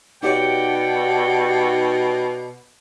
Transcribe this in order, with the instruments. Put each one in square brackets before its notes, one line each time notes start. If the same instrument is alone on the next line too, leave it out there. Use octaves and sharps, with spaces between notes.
[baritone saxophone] B2 [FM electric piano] D#4 G4 C#5 [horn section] D5 G5 [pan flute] F#5